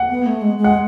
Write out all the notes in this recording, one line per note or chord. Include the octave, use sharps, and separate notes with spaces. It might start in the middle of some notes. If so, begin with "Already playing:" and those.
Already playing: F#5
B3
A3
G#3
G#3
F#5